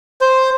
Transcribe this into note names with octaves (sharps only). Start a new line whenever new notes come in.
C5